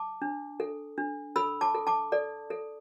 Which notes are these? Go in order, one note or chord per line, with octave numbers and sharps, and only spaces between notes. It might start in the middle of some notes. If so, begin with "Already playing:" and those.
Already playing: A5 D6
D4
A4
D4
A4 B5 E6
A5 D6
A4
A5 D6
A4 D5
A4